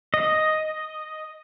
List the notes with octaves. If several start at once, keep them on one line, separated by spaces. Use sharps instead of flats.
D#5